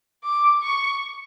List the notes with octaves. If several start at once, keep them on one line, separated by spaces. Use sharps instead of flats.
D6
C#6